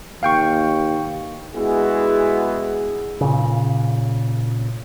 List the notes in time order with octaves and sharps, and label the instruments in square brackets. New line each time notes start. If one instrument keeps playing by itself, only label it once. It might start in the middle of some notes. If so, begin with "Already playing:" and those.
[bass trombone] D#2 [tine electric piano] F5 G5 C#6
[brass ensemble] G#3 B3 E4 F#4 G#4
[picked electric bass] A#2 C#3